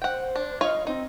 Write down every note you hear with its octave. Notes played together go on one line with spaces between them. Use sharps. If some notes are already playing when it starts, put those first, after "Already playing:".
C5 F#5 G5
D4
F4 C#5 D#5 F5
C4 D#4